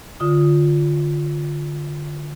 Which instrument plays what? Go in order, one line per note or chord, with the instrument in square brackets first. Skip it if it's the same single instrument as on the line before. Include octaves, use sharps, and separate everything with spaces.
[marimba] D3 F4 D#6